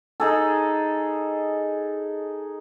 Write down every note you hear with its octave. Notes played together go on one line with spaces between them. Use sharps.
D#4 G#4 A4